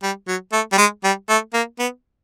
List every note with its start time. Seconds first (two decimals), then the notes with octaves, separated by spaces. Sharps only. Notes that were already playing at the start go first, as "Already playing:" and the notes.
0.03 G3
0.28 F#3
0.52 A3
0.72 G3
0.78 G#3
1.04 G3
1.29 A3
1.54 A#3
1.79 B3